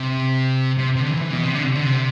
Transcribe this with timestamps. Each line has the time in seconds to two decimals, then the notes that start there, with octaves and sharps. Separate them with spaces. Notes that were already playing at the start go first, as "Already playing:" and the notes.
Already playing: C3
0.78 C3
0.96 C3
1.00 D3
1.11 E3
1.22 E3
1.33 B2
1.43 C3
1.55 D3
1.65 C3
1.75 D3
1.85 C3